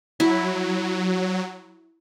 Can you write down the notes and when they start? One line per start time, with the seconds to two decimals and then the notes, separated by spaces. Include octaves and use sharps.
0.20 F#3 E4